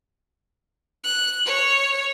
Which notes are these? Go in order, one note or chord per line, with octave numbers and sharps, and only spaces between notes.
F#6
C#5